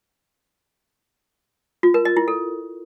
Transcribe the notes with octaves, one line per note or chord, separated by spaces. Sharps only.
F4
A#4
D#5
E4
A4